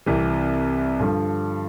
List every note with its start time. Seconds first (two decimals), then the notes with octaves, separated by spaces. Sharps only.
0.06 C2 C3 E3
0.99 G2 D3 F3